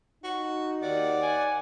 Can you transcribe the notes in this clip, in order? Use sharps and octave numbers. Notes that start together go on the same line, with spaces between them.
D#4 F#4
D#2 D5 F#5 D6
G#5